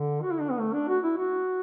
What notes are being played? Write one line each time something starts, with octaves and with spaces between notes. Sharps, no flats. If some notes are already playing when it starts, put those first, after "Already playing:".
Already playing: D3
F#4
E4
D4
B3
A3
D4
F#4
E4
F#4